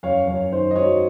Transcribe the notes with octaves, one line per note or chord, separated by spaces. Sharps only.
F#2 C#5 F5
F#2 C#5
D#3 C5
D#5
F#3 C#5